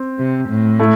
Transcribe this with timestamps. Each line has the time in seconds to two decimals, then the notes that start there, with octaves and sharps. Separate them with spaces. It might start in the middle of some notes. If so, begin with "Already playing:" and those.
Already playing: C4
0.18 C3
0.48 A2
0.79 A3 E4